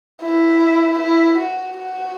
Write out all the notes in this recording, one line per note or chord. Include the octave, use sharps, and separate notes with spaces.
E4
E4
F#4
F#4